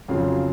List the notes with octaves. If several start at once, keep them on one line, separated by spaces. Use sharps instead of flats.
F2 C#3 F#3 F5